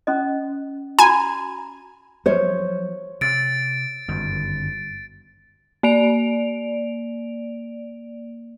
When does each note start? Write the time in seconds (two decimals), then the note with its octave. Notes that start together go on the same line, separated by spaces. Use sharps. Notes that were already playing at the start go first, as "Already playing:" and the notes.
0.07 C#4 D#5
0.99 F#4 G#5 A#5 B5
2.26 F3 F#3 C5 C#5
3.21 C3 A6 D7
4.08 G1 F#2 D#3
5.83 A#3 D5 D7 F7